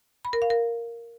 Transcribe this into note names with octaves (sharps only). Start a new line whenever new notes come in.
B5
A#4
F5
A#4